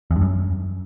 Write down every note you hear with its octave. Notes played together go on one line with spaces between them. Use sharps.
E2
G2
F#2